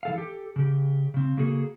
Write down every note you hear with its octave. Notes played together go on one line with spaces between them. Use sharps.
E3 A4 F5
G4 A4
C#3 G4
C#3 C4
C#3 A#3 F#4 G#4 A4